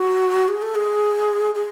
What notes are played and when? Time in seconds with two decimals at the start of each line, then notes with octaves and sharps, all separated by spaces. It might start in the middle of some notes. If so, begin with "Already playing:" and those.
Already playing: F#4
0.48 G#4
0.62 A4
0.75 G#4
1.55 G#4